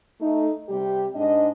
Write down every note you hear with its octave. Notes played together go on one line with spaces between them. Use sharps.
A3 D#4
C3 G3 G4
G#2 D4 D#5